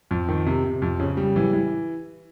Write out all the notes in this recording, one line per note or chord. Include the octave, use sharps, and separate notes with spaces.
F2
D#3
C3
C3
F2
C#3
G3
E3
E3